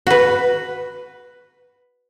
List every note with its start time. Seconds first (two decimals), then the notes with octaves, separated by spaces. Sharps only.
0.07 F#4 B4